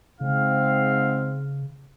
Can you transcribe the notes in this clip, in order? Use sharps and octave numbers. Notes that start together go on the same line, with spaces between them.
G#2 C#3 C4 F5